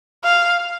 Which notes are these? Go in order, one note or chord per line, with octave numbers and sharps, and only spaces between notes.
F5